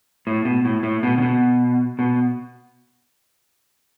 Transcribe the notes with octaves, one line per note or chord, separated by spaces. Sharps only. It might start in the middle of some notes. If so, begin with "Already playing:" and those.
A2
B2
A2
A2
B2
C#3
B2
B2